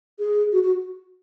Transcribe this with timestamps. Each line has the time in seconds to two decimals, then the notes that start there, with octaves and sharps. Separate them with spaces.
0.19 G#4
0.52 F#4
0.63 F#4